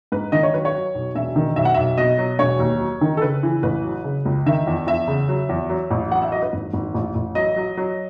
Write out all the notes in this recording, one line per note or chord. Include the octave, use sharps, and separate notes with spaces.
G#2 B4
D#3 D#5
C#5
F#3 B4
C#5
F#3
B1
E1 E5
D#3
B1 E5
F#5
B1 E5
B2 D#5
F#3
E1 C#5
D#2
F#3
D#3
A4
C#3 B4
E3
A1 B4
F#3
C#3
C#2
D#3 E5
E2
E2 E5
C#3
F#3
E2
F#3
A1
F#3 F#5
E5
F#3 D#5
B4
G#1
G#1
A1
A1
F#3 D#5
F#3
F#3